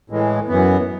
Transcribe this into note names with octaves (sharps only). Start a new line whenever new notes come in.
A2 E3 G#3
F#2 E3 B3